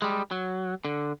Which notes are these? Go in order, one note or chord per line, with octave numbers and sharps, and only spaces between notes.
G3 G#3
F#3
D3